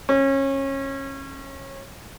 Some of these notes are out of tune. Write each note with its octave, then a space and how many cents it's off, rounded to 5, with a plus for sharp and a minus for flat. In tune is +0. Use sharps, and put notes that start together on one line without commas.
C#4 -25